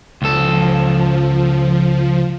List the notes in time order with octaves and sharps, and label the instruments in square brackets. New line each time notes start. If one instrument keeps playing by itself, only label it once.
[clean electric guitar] C#2 A4 [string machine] F3